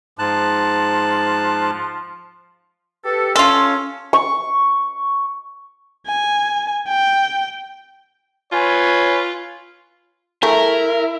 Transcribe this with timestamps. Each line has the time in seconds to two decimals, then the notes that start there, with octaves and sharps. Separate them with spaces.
0.19 G#2 F3 A5 F#6
3.05 G4 A4 B4
3.36 C#4 F4 A4 C6
4.13 C#6
6.07 G#5
6.87 G5
8.52 F4 B4 C#5 G#5
10.43 A3 E4 G#4 A#4